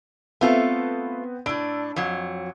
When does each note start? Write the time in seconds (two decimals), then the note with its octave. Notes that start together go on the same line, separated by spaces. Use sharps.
0.41 A3 B3 C4 F4 A4
1.46 A2 D4 E6 D7
1.96 F2 F#3